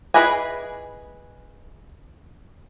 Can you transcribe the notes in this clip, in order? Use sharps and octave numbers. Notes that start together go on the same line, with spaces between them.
E4 G#4 B4 D#5 G#5